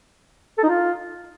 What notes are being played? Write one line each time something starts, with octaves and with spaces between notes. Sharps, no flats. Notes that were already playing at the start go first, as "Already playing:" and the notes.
A4
D#4
F4